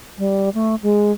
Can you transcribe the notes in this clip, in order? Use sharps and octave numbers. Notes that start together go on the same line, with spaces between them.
G3
A3
G#3